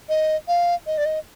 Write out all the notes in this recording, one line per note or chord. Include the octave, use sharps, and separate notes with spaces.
D#5
F5
D#5
D5
D#5